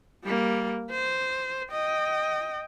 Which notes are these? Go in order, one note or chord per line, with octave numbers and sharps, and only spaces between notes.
G3 A#3
C5
D#5 G5